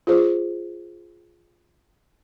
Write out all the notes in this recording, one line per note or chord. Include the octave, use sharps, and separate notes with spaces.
F4 G#4 C5